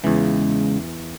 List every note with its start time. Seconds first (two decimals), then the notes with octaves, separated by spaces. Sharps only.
0.04 E2 C#3 E3 G#3